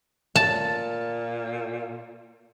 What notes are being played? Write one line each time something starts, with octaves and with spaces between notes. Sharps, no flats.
A#2 A5